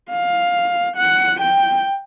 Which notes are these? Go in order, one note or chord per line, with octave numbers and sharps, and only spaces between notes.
F5
F#5
G5